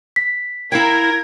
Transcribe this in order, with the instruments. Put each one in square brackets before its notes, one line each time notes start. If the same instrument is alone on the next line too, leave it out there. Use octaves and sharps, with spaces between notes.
[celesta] B6
[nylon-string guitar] E4 F5 G5 [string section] A#4 [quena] G#6